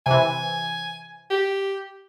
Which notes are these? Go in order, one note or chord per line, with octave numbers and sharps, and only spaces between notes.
C3 E3 G#5
G4